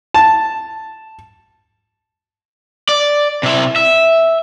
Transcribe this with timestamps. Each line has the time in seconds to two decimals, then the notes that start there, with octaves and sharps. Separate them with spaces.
0.14 A5
2.89 D5
3.43 C3 E4
3.76 E5